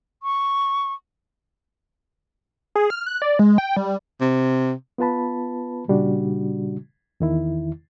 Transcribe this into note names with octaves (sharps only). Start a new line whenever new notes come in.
C#6
G#4
F6
F#6
D5
G#3
G5
G3
C3
B3 F4 B4 A5 B5
A#2 C#3 G3 D4 F#4
E2 D#3 E4